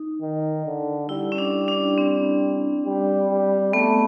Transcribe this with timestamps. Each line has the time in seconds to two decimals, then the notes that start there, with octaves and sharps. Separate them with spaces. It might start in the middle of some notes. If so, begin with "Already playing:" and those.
Already playing: D#4
0.21 D#3
0.66 D3
1.09 G3 E4
1.32 C#4
1.38 D4
1.68 D4
1.98 C4
2.85 G3
3.30 G3
3.73 A3 B3